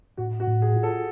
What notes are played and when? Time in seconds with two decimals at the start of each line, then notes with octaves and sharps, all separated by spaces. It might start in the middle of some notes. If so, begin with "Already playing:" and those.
0.17 A2 F#4
0.40 F#4
0.47 A2
0.62 G#4
0.76 F4
0.83 A4